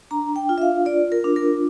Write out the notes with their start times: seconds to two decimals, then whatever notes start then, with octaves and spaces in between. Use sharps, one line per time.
0.11 D4 A#5
0.36 G5
0.49 F4
0.58 E5
0.62 F5
0.86 F4 D5
1.12 A#4
1.24 D4
1.36 A#4